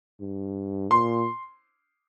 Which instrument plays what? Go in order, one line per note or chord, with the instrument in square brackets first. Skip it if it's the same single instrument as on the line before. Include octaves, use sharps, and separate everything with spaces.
[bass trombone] G2
[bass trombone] A#2 [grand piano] C6